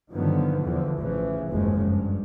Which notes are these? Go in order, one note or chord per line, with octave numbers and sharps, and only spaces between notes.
G2 D3 D#3 F3 F#3 B3
E2 D3 E3 F3
A1 C#3 E3 F3
F#1 D#2 G#2 C#3 F3 G#3
G2